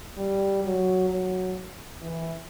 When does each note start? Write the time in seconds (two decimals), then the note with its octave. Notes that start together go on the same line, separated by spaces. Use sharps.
0.17 G3
0.63 F#3
1.09 F#3
2.02 E3